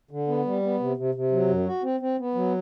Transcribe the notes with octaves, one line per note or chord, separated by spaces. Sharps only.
D3
B3
G3
B3
C3
C3
C3
F#3
F#2
F#4
C4
C4
B3
F#3